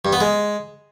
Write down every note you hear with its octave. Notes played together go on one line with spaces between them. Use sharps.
G2
B3
G#3